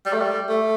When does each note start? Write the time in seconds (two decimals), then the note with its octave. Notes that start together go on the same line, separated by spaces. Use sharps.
0.06 G3
0.13 A3
0.20 G3
0.49 A3